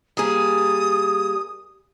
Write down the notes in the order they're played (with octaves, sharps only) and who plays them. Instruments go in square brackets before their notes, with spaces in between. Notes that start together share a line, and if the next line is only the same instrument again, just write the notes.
[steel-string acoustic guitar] G3 A#3 G#4 [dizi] D#6